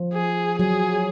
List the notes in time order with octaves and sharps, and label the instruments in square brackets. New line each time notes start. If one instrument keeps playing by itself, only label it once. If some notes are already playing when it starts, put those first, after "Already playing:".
Already playing: [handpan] F3
[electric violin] G#4
[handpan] F#3 [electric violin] G#4